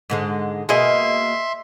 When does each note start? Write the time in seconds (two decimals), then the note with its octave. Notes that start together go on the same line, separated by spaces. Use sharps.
0.10 G#2 D3 G#3
0.69 B2 A#3 G#4 D#5 E5 C6